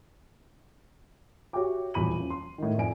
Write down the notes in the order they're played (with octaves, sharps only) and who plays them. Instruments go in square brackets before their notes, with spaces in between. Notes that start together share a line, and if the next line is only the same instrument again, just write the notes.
[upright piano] F#4 G4 C#5 E5 G5 D6
D#1 E2 F#3 B5 D#7 F#7
F3 C#4
C6
A2 D#3
F2 D5 G#5 D7